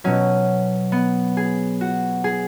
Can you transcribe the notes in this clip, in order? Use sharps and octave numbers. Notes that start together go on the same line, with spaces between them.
B2 F#3 C#4
B3
G#4
F#4
G#4